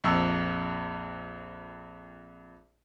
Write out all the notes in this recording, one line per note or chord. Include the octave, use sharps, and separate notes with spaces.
A#1 F2 D#5 C#6 E6